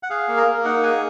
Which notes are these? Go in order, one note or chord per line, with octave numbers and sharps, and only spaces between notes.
F#5
G#4 F5
A#3
A#4
A#3
D#4 F#5
G#4 G#5